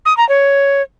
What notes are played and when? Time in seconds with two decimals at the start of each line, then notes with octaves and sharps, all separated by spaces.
0.05 D#6
0.17 A#5
0.29 C#5